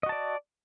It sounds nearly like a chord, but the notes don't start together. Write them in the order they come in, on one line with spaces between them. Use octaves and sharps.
D#5 F#4 A5 D5